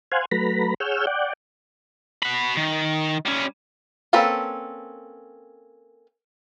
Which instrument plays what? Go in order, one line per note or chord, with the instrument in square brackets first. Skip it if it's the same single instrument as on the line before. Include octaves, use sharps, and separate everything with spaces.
[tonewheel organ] C5 F5 F#5 G#5
F#3 A3 B4 A#5 B5
G#4 C#5 F#5 E6 F6 G6
D5 F#5 G5
[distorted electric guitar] F#4 B5
D#3
G3 C#4
[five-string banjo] A#3 C4 C#4 A4 B4